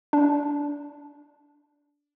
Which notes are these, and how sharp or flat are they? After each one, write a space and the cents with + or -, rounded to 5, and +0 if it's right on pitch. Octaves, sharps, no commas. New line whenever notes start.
D4 -15